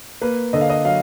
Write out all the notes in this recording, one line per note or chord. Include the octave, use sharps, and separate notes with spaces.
A#3 B4
D3 D#5
F5
D#5
F#3 F5